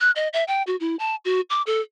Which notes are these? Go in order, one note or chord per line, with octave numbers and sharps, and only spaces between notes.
F#6
D#5
E5
G5
F#4
E4
A5
F#4
D6
A4